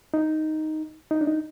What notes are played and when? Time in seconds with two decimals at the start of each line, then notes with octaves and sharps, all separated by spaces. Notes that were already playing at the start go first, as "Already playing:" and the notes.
0.14 D#4
1.11 D#4
1.21 D4
1.27 D#4